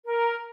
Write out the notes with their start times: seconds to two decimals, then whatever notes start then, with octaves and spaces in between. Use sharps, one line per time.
0.05 A#4